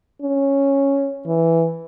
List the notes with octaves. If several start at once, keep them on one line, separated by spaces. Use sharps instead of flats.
C#4
E3